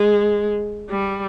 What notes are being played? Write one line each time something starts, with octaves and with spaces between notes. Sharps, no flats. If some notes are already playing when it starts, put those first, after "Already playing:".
Already playing: G#3
G3